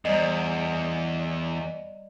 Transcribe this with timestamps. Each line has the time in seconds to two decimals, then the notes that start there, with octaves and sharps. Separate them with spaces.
0.05 E2 G3 D5 D#5